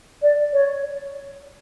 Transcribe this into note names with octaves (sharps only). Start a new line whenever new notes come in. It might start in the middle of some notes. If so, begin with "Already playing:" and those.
D5
C#5